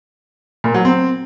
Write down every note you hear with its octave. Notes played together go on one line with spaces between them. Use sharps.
A#2
F#3
C4